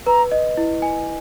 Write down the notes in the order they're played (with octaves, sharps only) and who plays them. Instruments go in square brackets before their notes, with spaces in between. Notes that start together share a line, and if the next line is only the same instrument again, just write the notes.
[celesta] B4 [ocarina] A#5
[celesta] D#5
E4
G#5